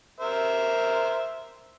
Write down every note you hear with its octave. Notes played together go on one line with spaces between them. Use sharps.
A#4 C5 E5